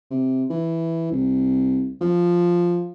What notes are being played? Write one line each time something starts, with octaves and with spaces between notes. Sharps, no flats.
C3
E3
C2
F3